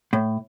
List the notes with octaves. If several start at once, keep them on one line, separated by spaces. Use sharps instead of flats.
A2